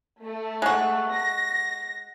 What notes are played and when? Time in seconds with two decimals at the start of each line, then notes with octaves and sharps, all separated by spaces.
0.22 A3
0.62 G#3 F#4
1.13 A#6